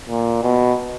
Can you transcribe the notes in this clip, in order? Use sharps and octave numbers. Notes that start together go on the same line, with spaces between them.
A#2
B2